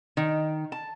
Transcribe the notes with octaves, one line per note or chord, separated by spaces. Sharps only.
D#3
A5